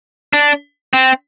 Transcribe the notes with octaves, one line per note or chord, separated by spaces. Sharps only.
D4
C4